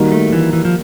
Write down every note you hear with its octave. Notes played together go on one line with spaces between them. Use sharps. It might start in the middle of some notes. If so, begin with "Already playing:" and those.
Already playing: D#3 G3 A#3 D#4 F#4
A3
E3
E3
F3